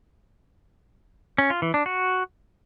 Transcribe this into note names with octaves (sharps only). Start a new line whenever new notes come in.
C#4
F4
E3
D4
F#4